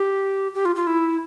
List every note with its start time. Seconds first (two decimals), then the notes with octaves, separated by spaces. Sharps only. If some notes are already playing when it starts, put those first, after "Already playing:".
Already playing: G4
0.54 G4
0.65 F4
0.76 F4
0.87 E4